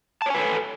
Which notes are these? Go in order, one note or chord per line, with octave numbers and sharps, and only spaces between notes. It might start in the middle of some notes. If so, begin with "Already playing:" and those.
A4 B4 C#5 G#5 A5